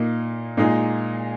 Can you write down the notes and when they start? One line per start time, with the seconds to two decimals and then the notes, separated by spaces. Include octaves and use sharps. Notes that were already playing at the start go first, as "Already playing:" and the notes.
Already playing: A#2 A#3 D#4
0.57 A#2 G#3 D#4 G#4